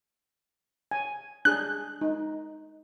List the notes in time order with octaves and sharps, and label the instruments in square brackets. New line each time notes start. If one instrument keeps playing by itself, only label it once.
[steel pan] G#5
[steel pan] D4 G#4 [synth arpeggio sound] F#6
[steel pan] D#4